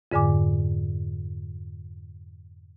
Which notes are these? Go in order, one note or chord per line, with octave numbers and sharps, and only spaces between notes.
F2 G#2 D3 G#5 D6